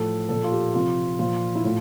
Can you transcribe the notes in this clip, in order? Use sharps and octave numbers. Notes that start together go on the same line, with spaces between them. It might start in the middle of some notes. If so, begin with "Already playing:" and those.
Already playing: A2 F3 A4
A#2 F3 A4
F4
G4
C3 F3 F4
A#2 F3 F4
E4
A2 F4